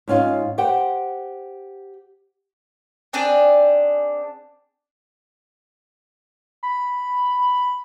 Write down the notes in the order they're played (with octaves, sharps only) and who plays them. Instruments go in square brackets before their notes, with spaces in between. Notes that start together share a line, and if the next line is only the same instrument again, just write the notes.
[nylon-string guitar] G#2 C#4 F4
G4 C5 F#5 G5
[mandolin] C4 D4 G#4 D5
[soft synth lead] B5